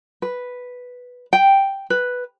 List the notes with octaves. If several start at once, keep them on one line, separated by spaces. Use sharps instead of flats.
B4
G5
B4